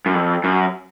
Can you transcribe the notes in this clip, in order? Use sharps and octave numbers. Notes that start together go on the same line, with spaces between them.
F#2
F2
F#2